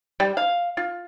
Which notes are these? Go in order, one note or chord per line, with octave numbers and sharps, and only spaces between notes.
G3
F5
F4